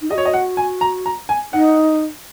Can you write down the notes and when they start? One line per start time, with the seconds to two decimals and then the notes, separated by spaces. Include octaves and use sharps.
0.01 D#4
0.10 G#4 D#5
0.15 F#4 C#5
0.25 D#5
0.33 F#5
0.57 G#5
0.81 A#5
1.06 A#5
1.29 G#5
1.53 D#4 F#5